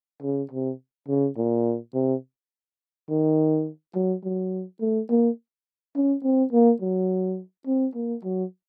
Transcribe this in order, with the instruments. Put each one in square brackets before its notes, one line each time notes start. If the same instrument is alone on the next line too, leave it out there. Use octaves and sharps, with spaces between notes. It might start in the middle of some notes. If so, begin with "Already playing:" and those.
[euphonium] C#3
C3
C#3
A#2
C3
D#3
F#3
F#3
A3
A#3
C#4
C4
A#3
F#3
C4
A#3
F#3